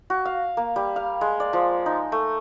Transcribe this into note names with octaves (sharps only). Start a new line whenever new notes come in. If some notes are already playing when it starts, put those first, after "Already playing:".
F#4
F5
A#3
G3
F5
G#3
D5
F3
D#4
A3